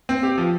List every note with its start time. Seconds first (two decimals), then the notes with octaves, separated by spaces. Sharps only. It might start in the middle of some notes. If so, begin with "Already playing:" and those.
0.09 C4
0.23 G4
0.38 F3